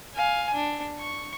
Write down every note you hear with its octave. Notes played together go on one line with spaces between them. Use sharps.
F5 G#5
D4
C#6